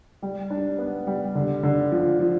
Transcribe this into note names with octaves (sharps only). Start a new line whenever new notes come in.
G3
D4
B3
G3
D3
D3
F3
F3